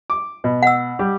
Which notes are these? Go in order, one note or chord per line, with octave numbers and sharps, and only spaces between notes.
D6
B2
F#5 E6
G3 G4